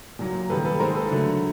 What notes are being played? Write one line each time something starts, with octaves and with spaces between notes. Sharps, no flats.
A#2 F#3 A#3
D#3 G3 A#3 A4 B4
A4 B4
D#3 G#3 A#4 C5
A4 B4
D3 F#3 A3